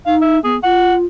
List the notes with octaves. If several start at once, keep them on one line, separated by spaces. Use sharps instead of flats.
D#4 F5
E5
B3 G#4
F4 F#5